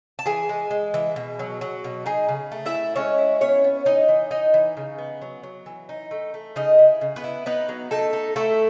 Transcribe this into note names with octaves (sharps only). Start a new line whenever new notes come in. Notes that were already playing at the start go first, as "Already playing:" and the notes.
A5
E3 G#4 G#5
G#3
G#3
E3
B2
F#3
F#3
B2
D#4 G#4 G#5
C#3
A3
E4 E5
A3
G#3 C#4 C#5
E4
B3 C#4 C#5
B3
E3 D#4 D#5
E3
E3 D#4 D#5
E3
C#3
B3
F#3
F#3
E3
D#4
A3
A3
C#3 D#4 D#5
E4
C#3
B3 B4
E4
B3 D#4 B4
F#3
A3 D#4 A4
D#4
A3 E4 A4